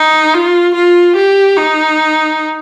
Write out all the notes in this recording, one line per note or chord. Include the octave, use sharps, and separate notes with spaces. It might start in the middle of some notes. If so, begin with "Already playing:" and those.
Already playing: D#4
F4
F4
G4
D#4